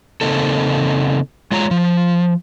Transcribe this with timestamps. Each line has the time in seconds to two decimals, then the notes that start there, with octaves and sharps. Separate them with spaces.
0.21 C#3 A#3 C4 D#4 A4
1.51 G#3 F4 C#5 A#5
1.71 F3